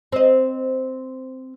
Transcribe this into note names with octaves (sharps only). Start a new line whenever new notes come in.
C4 D#5